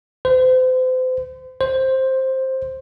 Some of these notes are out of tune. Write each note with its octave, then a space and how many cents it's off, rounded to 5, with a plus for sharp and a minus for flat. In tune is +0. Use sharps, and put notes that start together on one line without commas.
C5 -35
C5 +10